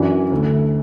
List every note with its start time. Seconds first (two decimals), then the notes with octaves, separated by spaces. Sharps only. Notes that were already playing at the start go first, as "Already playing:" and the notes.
Already playing: F#2 E3 D4 F#4
0.31 D2 D3 A3